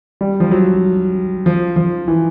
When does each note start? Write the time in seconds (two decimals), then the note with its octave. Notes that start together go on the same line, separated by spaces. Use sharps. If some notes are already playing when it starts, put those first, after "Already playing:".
0.21 G3
0.40 F3
0.51 F#3
1.46 F3
1.76 F3
2.08 E3